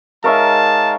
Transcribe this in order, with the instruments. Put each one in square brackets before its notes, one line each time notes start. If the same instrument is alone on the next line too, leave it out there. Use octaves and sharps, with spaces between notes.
[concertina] G#3 D#4 F5 [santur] A#4 C#5 E5 [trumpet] A5